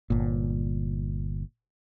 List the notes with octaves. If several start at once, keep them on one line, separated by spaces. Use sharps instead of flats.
G1 A#2